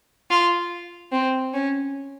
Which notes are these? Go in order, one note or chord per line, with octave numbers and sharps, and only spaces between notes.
F4
C4
C#4